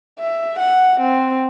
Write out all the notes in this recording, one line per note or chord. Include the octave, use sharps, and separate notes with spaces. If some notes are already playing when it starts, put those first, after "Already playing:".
E5
F#5
C4